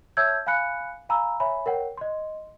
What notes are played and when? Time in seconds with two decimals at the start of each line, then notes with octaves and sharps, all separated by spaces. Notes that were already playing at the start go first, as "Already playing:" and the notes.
0.17 C#5 E5 A5 E6 G6 G#6
0.47 F5 G#5 B5 F#6 C#7
1.09 F5 G#5 A#5 B5 E6
1.40 C#5 E5 G#5 B5
1.66 A#4 C#5 F#5 G5
1.97 D#5 C6